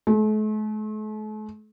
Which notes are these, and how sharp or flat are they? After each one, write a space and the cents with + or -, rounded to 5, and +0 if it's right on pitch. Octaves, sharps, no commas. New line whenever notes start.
A3 -45